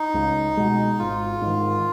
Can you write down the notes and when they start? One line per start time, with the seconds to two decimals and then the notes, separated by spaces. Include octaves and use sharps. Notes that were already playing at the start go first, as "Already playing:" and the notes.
Already playing: D#4
0.14 C#2
0.57 B2 G#3
0.99 G#1 F4
1.42 G#2 D#3